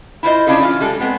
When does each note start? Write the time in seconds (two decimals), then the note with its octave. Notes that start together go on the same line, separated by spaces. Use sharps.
0.23 E4 F4 C5 D#5
0.47 C#4 D4 E4 F4 G#4 A4
0.62 E3 F4
0.80 G3 G#3 A4
1.00 G#3 B3 C4